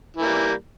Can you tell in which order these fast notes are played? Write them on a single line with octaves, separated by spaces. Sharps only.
E3 A#3 G3